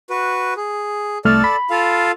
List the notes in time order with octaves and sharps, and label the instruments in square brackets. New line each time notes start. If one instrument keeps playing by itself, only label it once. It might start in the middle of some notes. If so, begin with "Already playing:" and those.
[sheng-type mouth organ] F#4 B4
G#4
[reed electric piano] C2 A3 F6 [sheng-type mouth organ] A4 D5
[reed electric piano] B5
[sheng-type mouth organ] F4 A4 F5